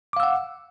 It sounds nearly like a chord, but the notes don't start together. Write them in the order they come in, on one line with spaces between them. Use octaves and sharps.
D6 F5 E6 F#5